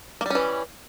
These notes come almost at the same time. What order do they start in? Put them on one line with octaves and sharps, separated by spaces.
A#3 G3 C#4 E3